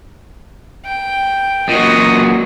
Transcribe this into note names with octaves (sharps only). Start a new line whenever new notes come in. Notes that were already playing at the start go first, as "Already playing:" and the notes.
G5
A#2 F#3 F#4 D#5